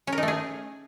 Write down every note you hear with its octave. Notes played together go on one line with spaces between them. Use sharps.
C#4
A#4
D#4
A3
G#4